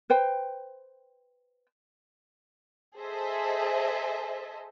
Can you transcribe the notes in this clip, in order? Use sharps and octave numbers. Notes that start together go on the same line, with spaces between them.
B4 C5 G5
G#4 A4 C5 D#5 E5